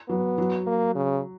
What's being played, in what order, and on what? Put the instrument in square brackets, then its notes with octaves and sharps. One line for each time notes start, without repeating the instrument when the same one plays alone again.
[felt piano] F#3 [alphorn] B3
[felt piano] F#3
[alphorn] A#3
C#3